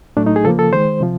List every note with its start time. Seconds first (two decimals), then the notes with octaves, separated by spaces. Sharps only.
0.17 A2 F#3 A3 D4
0.26 D#4
0.36 G#4
0.45 C#3 F3 A#3 A4
0.59 A4
0.73 D#3 G#3 C5
1.01 C3 F3